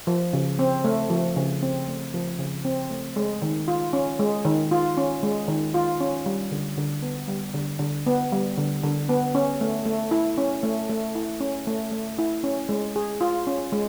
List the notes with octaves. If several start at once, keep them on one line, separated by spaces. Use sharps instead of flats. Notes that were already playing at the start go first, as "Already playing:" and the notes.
F3
C#3
C4
A3
F3
C#3
C4
A3
F3
C#3
C4
A3
G#3
D#3
F4
C#4
G#3
D#3
F4
C#4
G#3
D#3
F4
C#4
G3
D3
D3
B3
G3
D3
D3
B3
G3
D3
D3
B3
C#4
A3
A3
E4
C#4
A3
A3
E4
C#4
A3
A3
E4
C#4
G#3
G#4
F4
C#4
G#3